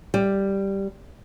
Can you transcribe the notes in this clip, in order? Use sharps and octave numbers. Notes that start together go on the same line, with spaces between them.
G3